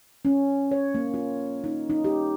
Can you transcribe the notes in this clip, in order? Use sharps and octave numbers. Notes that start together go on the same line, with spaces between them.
C#4
C#5
A#3
F4
D#4
D#4
G4